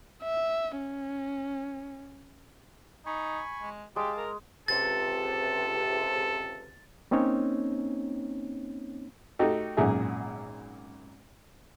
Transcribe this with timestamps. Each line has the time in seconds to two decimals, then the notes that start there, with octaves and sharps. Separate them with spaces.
0.24 E5
0.77 C#4
3.06 D#4 G#5 B5 C#6
3.61 G#3
3.96 G#3 G4 F5 A5 D6
4.17 A#4
4.68 C#2 C3 A4 A6
7.11 A#3 C4 C#4 D#4 C#5
9.39 A3 D#4 F#4 G4 A4
9.77 G#1 F#2 A#2 G#4 E5